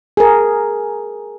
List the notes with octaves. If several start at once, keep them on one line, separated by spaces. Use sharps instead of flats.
G#4 A#4